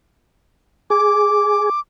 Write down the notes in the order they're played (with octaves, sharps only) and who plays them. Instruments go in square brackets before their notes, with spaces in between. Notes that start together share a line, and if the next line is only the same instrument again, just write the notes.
[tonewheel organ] G#4 [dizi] D6